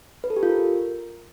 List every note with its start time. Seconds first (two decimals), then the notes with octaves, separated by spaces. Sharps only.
0.24 B4
0.30 A4
0.36 G4
0.43 F4
0.49 A#4